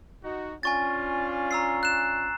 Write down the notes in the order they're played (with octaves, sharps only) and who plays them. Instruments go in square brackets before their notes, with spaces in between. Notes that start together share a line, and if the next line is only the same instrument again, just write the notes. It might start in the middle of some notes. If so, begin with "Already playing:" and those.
[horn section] D#4 F#4
[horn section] C#4 D4 F4 [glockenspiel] G#5 C#6 A6
[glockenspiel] A#5 E6 C7
F#6 E7